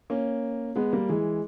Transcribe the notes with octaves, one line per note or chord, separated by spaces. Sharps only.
A#3 C#4
G#3 B3
G3 A#3
E3 G#3